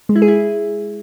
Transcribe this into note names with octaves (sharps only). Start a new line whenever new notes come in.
G#3
E4
G#4
E4